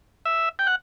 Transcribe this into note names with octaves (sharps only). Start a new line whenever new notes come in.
E5
G5
F#5